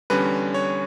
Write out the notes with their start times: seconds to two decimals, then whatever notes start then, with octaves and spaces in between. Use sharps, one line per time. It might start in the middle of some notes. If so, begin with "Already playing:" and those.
0.10 E2 D3 G3 C#4 B4
0.54 C#5